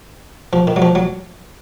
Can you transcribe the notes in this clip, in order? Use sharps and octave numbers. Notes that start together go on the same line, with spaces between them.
F3
D#3
F#3
F3
F#3